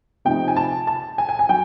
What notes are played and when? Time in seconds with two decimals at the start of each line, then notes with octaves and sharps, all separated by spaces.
0.25 C3 F3 A3 C4 D#4 G5
0.48 G#5
0.56 A5
0.87 A5
1.18 G#5
1.29 G#5
1.39 G#5
1.49 F#3 G5